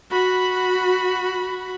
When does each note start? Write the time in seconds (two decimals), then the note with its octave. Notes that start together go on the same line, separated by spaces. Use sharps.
0.12 F#4 B5